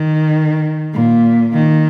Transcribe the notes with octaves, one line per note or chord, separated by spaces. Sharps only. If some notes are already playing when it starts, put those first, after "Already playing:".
Already playing: D#3
A#2
D#3